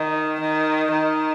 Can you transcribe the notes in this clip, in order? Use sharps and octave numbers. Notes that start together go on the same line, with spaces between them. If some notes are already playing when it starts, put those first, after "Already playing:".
Already playing: D#3
D#3
D#3